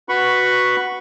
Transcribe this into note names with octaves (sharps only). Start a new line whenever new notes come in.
F#4 B4 B5 C#6